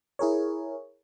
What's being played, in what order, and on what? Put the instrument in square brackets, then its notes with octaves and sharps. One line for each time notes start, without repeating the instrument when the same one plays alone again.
[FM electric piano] E4 G#4 A#4 C#5